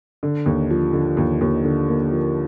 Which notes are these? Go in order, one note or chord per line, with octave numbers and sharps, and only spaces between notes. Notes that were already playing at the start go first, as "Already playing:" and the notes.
D3
D#2
F3
D3
D#2
D#2
D3
A#3
F3